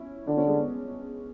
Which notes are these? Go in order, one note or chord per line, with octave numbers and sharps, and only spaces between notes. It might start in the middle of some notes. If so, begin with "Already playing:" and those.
Already playing: C#4 E4
D3 D4
C#4
G#3
B3